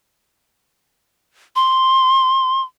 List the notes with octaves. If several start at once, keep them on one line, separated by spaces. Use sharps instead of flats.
C6